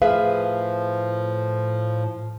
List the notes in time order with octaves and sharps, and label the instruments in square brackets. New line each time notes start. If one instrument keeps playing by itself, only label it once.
[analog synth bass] A2 [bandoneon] F3 [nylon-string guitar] G#4 B4 E5 [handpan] F5